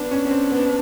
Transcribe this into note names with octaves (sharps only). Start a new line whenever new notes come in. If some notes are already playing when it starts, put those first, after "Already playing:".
Already playing: B3 D4
C#4
C#4
C4
B3